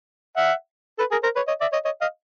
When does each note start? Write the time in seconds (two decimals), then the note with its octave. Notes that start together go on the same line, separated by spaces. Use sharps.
0.37 E5 F#5
0.98 A4 B4
1.12 G#4 A#4
1.23 A#4 C5
1.36 B4 C#5
1.48 C#5 D#5
1.61 D5 E5
1.73 C#5 D#5
1.85 C#5 D#5
2.01 D#5 F5